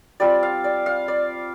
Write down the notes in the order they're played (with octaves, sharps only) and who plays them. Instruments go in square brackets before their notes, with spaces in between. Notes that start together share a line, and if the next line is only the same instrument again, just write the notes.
[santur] G3 C4 F4 D5
F5
D5
F5
D5